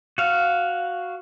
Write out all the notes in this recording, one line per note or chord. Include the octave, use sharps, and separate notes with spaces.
F#4 F5